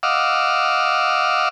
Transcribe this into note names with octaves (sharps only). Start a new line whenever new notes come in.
D#5 F5 F#5 D6 E6 F6